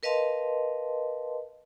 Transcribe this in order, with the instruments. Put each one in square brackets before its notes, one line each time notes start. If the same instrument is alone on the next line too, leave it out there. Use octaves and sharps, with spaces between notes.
[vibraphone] A#4 B4 D#5 F5 A5 C6